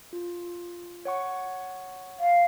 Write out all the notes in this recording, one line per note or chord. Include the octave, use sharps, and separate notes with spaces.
F4
C#5 F#5 C#6
F5